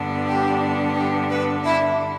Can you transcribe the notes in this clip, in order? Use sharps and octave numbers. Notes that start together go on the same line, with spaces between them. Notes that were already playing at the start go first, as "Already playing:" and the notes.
Already playing: G2 D3 B3 D4
G4
G4
B3 B4
E4 E5